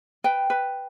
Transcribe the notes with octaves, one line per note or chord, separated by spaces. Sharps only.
B4 G5
B4